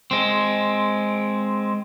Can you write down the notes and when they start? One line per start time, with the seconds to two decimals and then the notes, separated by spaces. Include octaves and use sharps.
0.11 G#3 C4